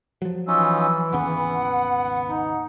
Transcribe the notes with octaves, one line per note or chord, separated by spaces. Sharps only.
F3 F#3
E3 C#4 D#4 F4 E6
G#1 D#2 C#3 B3 F#5
D#4